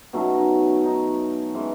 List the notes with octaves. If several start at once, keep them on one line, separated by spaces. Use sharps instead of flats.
B2 F#3 A3 C#4 D#4
D#4
D#4
E3 G#3 C#4